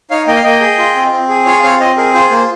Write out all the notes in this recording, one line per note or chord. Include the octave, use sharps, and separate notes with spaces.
D#4 C#5 F5
A#3 D#5 G5
F5
A#3 D#5 G5
G#4
F4
C4
C4
G#4
F4 C#5 F5
C4 C#5 F5
C4 C5 D#5
G#4 A#4
F4 C5
A#3 C5